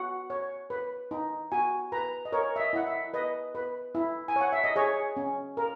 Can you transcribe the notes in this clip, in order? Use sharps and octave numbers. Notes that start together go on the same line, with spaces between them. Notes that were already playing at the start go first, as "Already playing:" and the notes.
Already playing: F#4 F#5
C#5
B4
D#4
F#4 G#5
B4 A#5
D#5
A#4 C#5
E5
D#5
E4 F#5
E5
B4 D#5
B4
E4
G#5
C#5 F#5
E5
D#5
G#4 C#5
C#4
A#4